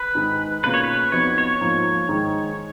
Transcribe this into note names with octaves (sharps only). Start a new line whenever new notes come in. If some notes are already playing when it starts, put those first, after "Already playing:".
Already playing: B4
G#2 D#3 G#3 D#4 G#4
B2 A#3 C#4 F4 G#4 B4
C#5
B4
F2 F3 B3 D#4 F#4 C#5
C#5
G#2 F3 A#3 F4
G#2 D#3 G#3 D#4